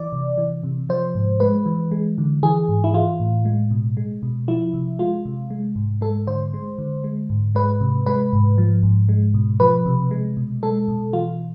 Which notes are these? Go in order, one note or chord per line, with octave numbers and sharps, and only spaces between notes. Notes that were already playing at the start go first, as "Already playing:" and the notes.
Already playing: E3 D5
C3
E3
C3
F3 C5
G#2
G#3 B4
E3
G#3
D3
E3 G#4
G#2
E4
E3 F4
A2
G#3
B2
G#3
B2
F3 E4
C3
G#3 F4
C3
G#3
G#2
G#3 A4
D3 C5
G#3
D3
G#3
G#2
G#3 B4
C3
G#3 B4
G#2
F3
G#2
G#3
B2
F3 B4
C3
G#3
B2
G#3 A4
B2
E3 F4